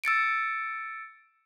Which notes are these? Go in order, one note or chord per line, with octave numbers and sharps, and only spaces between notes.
E6 A6 C#7 D7